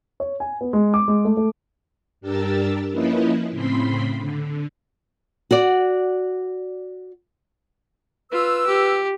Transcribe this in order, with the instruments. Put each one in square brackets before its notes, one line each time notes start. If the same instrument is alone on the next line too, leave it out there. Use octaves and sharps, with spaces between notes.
[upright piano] C#5
G#5
B3
G#3
D6
G#3
A3
A3
[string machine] G2 D4 G4 A#4 E6 A6
F3 A#3 C#4 E4 B4 D#5
A2 C#3 C4 B5 C6 B6
D3
[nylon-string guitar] F#4 D5
[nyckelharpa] F4 [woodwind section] B4 E6
[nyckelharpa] G4